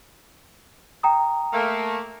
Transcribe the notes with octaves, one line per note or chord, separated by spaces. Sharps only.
G5 A#5 D#6
A3 A#3